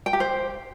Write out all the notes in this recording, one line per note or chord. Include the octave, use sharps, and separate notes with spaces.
G5
G4
C5